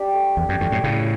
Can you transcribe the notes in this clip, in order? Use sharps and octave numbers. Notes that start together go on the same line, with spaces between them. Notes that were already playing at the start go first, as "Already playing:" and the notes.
Already playing: D4 G4
A3
E2 G4
F#2
E2 G2 A3
F#2 A2
A2 C#3 E4